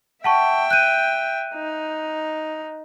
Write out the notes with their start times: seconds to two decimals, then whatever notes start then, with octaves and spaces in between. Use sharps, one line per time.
0.24 E5 F#5 G5 A5 C#6
0.71 F#6 G6 D#7
1.54 D#4